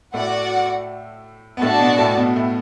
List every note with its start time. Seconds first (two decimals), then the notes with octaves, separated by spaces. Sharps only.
0.14 A2 A3 F#4 D5 F#5
1.57 B3
1.61 A2 A3 D4 F#4 D5 A5
1.80 B2 B3
1.98 A2 A3
2.17 B2 B3
2.36 A2 A3